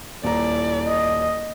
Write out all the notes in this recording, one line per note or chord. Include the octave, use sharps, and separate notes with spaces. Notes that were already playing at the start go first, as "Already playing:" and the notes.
D#1 E4 D5 A#5
D#5